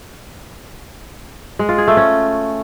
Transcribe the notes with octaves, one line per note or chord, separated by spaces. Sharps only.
G#3
F4
G#4
A3
C#4